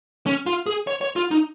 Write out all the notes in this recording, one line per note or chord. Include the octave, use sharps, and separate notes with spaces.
C#4
F4
G#4
C#5
C#5
F4
D#4